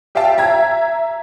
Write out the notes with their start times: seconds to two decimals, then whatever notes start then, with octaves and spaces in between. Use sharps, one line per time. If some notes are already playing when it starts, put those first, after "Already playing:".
0.15 G4 E5 F5 G5 A5
0.38 E5 A#5 G#6